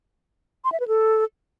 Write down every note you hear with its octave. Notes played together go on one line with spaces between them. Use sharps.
C6
E5
B4
A4